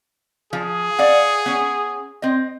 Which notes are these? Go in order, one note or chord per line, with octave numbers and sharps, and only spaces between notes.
F3 G#4
D5 F5 F#5
B3 C#4
C4 D#5